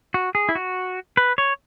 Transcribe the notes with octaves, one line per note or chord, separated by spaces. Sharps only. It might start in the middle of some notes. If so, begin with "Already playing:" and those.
F#4
G#4
E4
F#4
B4
C#5